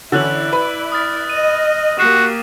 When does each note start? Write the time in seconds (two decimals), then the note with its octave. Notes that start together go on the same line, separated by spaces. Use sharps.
0.12 D3 E3 C#4 E4 D5 E6 F#6 F#7
0.53 B4 B5
0.92 D#6 F6 A6
1.29 D#5 D#7
1.99 A#3 F#4 G4 C7 D#7 E7